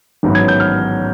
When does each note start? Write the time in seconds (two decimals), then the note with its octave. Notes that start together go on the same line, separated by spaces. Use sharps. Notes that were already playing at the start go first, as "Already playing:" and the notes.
0.23 A1 G#2 D#3 F#3 B3
0.35 G#6
0.48 G6
0.60 F6